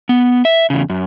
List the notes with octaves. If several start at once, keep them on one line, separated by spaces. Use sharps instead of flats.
B3
E5
E2 C#3
F#2